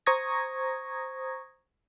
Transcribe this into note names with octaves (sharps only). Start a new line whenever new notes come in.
C5 A#5 C#6 D#6 G#6 A#6